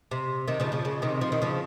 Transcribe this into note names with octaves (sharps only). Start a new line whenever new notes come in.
C3
C3 D#3
C#3 F3
C#3 F3
C#3
C3 D#3
F3
D#3
C#3 F3